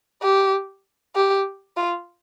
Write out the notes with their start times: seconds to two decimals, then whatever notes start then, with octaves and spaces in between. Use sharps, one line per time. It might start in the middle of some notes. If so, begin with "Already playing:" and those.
0.22 G4
1.15 G4
1.77 F4